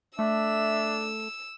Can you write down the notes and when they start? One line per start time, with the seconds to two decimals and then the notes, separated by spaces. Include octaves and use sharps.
0.19 A3 D4 E5 E6